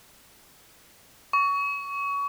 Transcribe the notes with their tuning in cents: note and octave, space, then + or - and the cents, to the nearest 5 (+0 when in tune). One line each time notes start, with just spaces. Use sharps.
C#6 +25